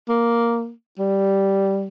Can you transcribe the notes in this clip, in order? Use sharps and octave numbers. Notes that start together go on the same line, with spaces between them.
A#3
G3